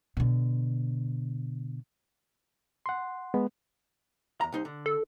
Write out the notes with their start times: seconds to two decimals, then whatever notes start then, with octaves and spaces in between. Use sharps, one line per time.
0.17 B2 D3
2.86 F#5 C6
3.34 G#3 B3
4.41 E2 A#5
4.52 C2 D#4 C5
4.65 D3
4.86 A4